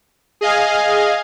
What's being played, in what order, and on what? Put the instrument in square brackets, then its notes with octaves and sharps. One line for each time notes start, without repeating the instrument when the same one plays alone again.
[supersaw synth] G#4 D#5 F5 G#5